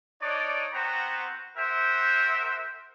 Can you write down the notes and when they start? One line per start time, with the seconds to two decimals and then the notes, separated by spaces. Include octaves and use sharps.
0.22 D4 D#4 C#5 D5
0.74 B3 C4 F#4 C5 A#5
1.57 F#4 A#4 C5 E5 G5